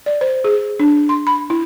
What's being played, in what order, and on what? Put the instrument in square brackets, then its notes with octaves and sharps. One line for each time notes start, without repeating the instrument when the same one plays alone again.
[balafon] D5
C5
G#4
D4
C6
B5
E4